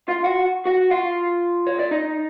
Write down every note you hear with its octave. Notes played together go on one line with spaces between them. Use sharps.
F4 F5
F#4 F#5
F#4 F#5
F4 F5
C#5
D5
D#4 D#5